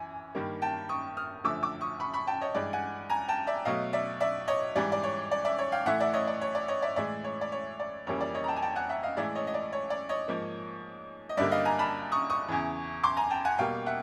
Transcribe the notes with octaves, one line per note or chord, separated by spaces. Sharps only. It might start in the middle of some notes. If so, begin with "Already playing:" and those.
Already playing: F#2 E3 G#5
G2 D#3 G3 A#3
G5 A5
C#6 D#6
D#6 F6
F#2 D3 F3 A3 D6 E6
D6 E6
C#6 D#6
B5 C#6
B5 C#6
G5 A5
C#5 D#5
G2 E3 G#3 D5
F#5 G#5
G#5 A#5
G5 A5
D5 E5
B2 F#3 A3 D#5 F5
D5 E5
D5 E5
C#5 D#5
G#2 E3 G3 D5
D5
C#5
D5
D5 E5
C#5
F5 G5
A2 E3 A3 E5 F#5
D5 E5
C#5 D#5
D5
C#5
D5
C#5 D#5
D5 E5
A2 E3 G#3 D5 E5
C#5
D5
C#5
D5
F2 C#3 E3 G3 A#3 C#5
D5
C#5 D#5
A#5
G5 A5
G#5
G5 A5
F#5 G#5
E5 F#5
D#5 F5
A2 E3 G#3 D5 E5
C#5 D#5
D#5
D5
C#5
D5
C#5 D#5
G#2 F3 A#3
D#5
G2 D3 G3 A#3 D5 E5
D#5 F5
G#5 A#5
A5 B5
C#6 D#6
C#6 D#6
E2 C#3 E3
C6 D6
G#5 A#5
G5 A5
F#5 G#5
B2 G3 A#3 F5 G5
E5 F#5